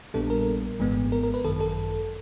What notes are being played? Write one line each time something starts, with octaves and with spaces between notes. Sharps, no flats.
A#1 A#2 G3 B3 D4 A4
A#4
G#1 G#2 E3 G#3 B3
A#4
A#4
B4
G#1 F#2 D#3 A4
A4